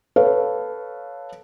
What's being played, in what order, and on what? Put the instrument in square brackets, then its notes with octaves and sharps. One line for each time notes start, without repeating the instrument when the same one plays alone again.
[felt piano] A4 B4 C#5 F5